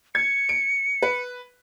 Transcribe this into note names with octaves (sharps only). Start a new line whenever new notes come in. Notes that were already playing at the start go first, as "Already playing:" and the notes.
G#6 C#7
D7
B4